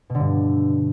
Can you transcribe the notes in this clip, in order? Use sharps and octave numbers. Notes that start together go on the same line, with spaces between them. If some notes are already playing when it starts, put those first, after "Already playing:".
B2
D3
G2